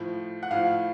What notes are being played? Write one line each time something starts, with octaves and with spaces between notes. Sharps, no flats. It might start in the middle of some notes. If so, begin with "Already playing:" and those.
Already playing: A2 F3
F#5
A2 F3 F5